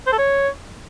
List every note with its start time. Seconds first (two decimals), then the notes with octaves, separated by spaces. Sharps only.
0.07 C5
0.13 A4
0.19 C#5